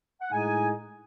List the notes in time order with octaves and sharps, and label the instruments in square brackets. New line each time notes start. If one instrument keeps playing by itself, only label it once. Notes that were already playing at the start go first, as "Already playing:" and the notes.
[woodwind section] F#5
[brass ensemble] A2 G#3 D#4 [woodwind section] G#5